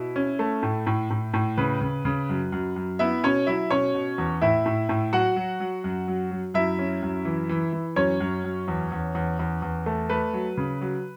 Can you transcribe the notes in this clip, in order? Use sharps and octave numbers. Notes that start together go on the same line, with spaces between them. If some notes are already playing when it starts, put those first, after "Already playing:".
Already playing: B2 E4
C#4
A3
A2
A2
A2
A2
C#3 B4
C#3
C#3
F#2
F#2
F#2
B3 E4 E5
B2 C#4 C#5
F#3 E4 E5
B2 C#4 C#5
B2
E2
A2 E4 E5
A2
A2
F#3 F#4 F#5
F#3
F#3
F#2
F#3
F#3
F#2 E4 E5
C#4
F#2
E3
E3
E3
F#2 C#4 C#5
F#2
F#2
E2
E2
E2
E2
E2
A3
A3 B4
F#3
C#3
F#3